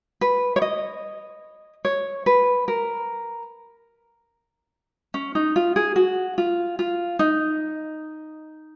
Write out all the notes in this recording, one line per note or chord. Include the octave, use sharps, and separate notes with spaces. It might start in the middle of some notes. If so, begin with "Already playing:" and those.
B4
C#5
D#5
C#5
B4
A#4
C#4
D#4
F4
G#4
F#4
F4
F4
D#4